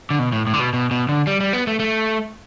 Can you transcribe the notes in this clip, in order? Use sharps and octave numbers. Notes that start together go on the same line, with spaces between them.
D3
B2
A2
A2
D3
B2
B2
B2
D3
G3
G3
B3
A3
A3